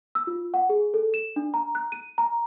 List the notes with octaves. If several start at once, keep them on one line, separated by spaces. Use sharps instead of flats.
E6
F4
F#5
G#4
A4
E7
D4
A#5
F#6
D#7
A#5